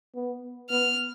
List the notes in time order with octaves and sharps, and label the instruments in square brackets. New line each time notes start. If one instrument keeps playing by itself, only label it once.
[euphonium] B3
[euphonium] B3 [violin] F6